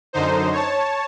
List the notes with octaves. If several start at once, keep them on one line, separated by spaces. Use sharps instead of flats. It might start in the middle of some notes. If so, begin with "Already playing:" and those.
F#2 D3 D#4 C5
C#5 A5